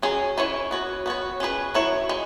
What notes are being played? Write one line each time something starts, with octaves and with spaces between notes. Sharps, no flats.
F#3 C#4 G#4
E3 C#4 E4 C#5
B3 F#4 C#5
B3 F#4 C#5
C#4 G#4 B4
F#3 E4 C#5
G#3